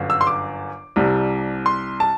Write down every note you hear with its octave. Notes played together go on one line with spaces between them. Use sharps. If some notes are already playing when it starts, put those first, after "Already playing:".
Already playing: G1 F#2 D3
E6
C6
D6
C2 C3 G3
C6
A5